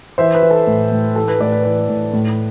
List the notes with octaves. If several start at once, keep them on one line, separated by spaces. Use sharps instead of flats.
E3 C5 E5
B4
E3
A4
A2
A2
E3 A4
B4
A2 B4 D5
B4
E3 B4
A2
A2